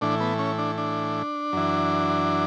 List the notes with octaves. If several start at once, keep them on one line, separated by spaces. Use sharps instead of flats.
A2 E3 D4
B3
C#4
D4
D4
F#2 E3